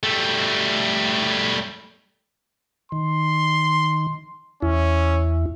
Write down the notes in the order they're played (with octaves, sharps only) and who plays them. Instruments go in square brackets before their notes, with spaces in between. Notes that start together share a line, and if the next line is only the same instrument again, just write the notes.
[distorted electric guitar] G3 A3
[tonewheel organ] D#3 [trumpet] C6
[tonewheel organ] E2 E4 [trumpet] C#4